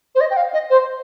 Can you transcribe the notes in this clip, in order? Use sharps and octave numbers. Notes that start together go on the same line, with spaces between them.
C5
D#5
G5
F5
D#5
C5